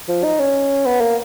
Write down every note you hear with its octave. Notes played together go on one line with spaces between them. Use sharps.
F3
D#4
C#4
B3
A#3